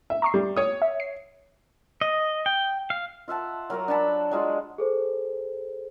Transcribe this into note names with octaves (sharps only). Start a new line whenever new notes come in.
E5
A#5 C#6 C7
G3
C#5 D#6
E5
C7
D#5
G5
F5
F4 E5 F#5 A5
F#3 A#4 C#5 A#5
D4 F#5 A5 B5
F#3 G#3 F4 F#4
G#4 A4 C5